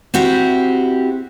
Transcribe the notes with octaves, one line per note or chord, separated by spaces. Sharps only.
C4 E4 F#4 G4